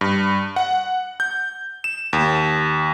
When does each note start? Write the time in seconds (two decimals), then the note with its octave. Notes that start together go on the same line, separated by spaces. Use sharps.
0.01 G2
0.56 F#5
1.20 G6
1.84 E7
2.13 D#2